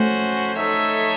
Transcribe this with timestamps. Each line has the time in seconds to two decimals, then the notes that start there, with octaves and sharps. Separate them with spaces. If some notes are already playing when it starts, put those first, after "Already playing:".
Already playing: A3 C#4 F#4 C5
0.55 D#4 A4 C#5 E5